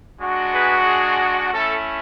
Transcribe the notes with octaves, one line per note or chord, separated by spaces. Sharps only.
G#3 D4 F#4
G#4 B4
G#4
A3 C#4 E4 A4